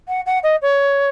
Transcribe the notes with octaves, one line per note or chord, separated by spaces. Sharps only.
F#5
F#5
D#5
C#5